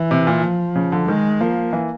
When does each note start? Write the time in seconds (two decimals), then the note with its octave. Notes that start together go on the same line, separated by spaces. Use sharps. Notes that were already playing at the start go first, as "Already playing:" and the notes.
Already playing: E3
0.11 C3
0.27 A#2
0.43 F3
0.75 C#3
0.92 D3
1.08 D#3 G#3
1.41 F3 A#3
1.73 E3